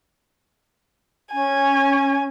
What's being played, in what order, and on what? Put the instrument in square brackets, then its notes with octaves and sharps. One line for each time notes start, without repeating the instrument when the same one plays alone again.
[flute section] C#4 [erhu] G#5